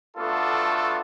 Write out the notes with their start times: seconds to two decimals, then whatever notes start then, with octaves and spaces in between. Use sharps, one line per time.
0.17 A3 B3 D4 F4 F#4 A4